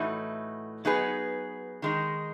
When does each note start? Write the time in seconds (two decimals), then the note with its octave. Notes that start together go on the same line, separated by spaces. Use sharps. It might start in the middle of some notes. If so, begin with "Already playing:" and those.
Already playing: A2 E3 A3 D#4 F#4
0.85 F#3 B3 D#4 G#4 B4
1.82 D#3 G#3 D#4